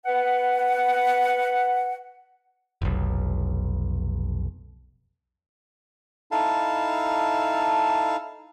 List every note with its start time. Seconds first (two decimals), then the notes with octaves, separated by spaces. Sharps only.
0.06 B4 F#5
2.82 F1 B1
6.31 D#4 E4 A4 F5 A5